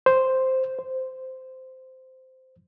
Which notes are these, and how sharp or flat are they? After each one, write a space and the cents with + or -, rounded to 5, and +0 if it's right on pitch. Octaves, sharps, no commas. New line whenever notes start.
C5 +0
C5 -10